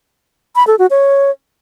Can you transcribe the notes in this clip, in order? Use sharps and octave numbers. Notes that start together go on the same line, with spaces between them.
B5
A4
F#4
C#5